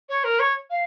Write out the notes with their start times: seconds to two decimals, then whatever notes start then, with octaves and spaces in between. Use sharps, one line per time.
0.09 C#5
0.24 A#4
0.39 C#5
0.70 F5